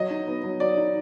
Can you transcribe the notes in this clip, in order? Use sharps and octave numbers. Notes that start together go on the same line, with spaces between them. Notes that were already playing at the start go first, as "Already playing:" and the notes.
Already playing: F#3 D#5
D#4
B3
F#3
F#3 D5
D#4